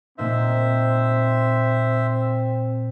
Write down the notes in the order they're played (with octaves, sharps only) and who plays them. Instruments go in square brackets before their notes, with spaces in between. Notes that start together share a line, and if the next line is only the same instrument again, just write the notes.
[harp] A#2 A#3 D#4 [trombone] C4 [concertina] C5 E5